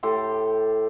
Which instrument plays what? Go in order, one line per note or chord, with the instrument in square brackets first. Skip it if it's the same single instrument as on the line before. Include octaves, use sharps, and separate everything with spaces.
[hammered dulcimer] A2 G4 A4 C6